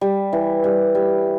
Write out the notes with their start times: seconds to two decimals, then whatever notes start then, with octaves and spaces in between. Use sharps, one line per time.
0.01 G3
0.33 E3
0.64 G3
0.95 G3